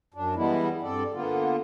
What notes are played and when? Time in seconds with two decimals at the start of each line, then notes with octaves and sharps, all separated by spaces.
0.14 F#2 D4
0.36 E3 G3 G#3 B3 E4
0.83 G2 C4 A4 D5
1.14 D3 A#3 B3 F4